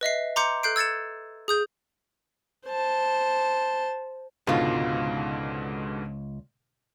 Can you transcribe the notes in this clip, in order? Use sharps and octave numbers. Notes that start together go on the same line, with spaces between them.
B4 D#5 E5 C7
A#5 C6 D6 G6 C#7
A4 F#6 G6 C7 D7
E6 G#6 A6 C#7 E7
G#4 D#6 G6
C5 A5
C#2 G#2 B2 D3 F4